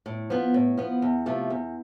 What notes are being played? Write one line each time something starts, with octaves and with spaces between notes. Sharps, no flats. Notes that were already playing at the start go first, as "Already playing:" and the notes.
A2
F3 B3
A2
F3 B3
E2
C3 F3 A3
E2